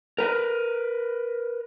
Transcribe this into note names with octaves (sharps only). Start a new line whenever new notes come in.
A#4 B4